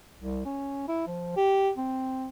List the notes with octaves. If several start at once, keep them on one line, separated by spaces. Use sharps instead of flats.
C2
C#4
E4
F3
G4
C4